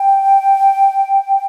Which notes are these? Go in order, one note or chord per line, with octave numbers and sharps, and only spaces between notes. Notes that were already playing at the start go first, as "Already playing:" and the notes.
Already playing: G5